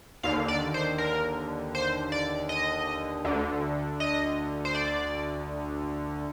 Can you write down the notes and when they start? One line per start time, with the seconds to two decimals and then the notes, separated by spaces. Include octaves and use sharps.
0.23 D#2 D3 F5
0.48 D5
0.74 C5
0.98 A#4
1.75 C5
2.12 D5
2.49 D#5
3.25 D2 D3
4.00 D#5
4.65 C5
4.75 D5